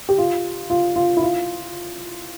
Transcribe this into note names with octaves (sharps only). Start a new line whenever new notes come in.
G4
F4
F4
F4
E4
F4